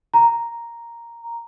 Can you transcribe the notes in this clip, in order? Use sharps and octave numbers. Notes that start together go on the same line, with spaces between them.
A#5